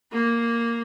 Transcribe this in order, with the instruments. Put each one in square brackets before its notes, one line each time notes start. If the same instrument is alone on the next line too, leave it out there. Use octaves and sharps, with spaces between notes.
[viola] A#3